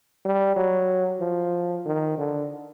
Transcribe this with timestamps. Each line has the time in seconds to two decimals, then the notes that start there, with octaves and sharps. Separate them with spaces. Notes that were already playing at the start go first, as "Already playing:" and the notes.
0.25 G3
0.56 F#3
1.21 F3
1.86 D#3
2.18 D3